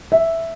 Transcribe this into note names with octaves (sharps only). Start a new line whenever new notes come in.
E5